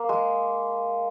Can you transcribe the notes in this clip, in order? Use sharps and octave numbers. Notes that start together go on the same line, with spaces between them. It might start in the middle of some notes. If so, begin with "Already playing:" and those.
Already playing: A#3
G#3